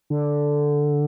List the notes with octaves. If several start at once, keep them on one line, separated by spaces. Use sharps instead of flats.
D3